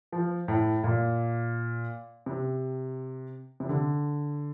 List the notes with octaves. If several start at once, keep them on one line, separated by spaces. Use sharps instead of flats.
F3
A2
A#2
C3
C3
D3